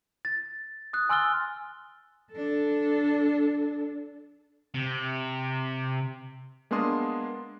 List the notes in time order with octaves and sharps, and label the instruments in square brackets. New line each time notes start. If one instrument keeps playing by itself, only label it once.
[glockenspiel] A6
D#6 F#6
G#5 C6 E6 F6 A6 G7
[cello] D4 A4
[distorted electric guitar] C3
[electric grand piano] G#3 A#3 B3 D4 C6 D#6